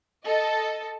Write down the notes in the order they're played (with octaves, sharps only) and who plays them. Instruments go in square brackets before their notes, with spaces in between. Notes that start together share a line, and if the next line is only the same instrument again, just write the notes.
[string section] A4 D#5 A5